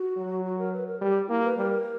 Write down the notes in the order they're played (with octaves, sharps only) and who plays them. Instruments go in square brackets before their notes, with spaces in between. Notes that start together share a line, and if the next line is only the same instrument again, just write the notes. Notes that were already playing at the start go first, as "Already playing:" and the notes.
Already playing: [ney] F#4
[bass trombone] F#3
[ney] F#4
A#4
B4
A#4
[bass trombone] G3 [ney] G4
[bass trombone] A#3 [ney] E4
[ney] B4
[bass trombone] G3 [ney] A#4